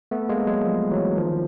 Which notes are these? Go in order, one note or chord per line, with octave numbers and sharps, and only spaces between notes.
A3 B3
G#3 A#3
F#3 G#3
F3 G3
E3 F#3
D#3 F3